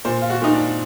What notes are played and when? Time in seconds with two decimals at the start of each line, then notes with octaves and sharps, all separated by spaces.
0.05 A#2 C5
0.22 F4
0.30 F#4
0.42 A#2 D#4
0.53 D4